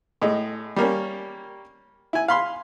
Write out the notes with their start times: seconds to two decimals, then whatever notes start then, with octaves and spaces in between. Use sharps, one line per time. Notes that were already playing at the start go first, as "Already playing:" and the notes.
0.22 A2 G#3
0.76 G3 A#3 C#4
2.13 E4 G#5
2.28 F5 B5 C6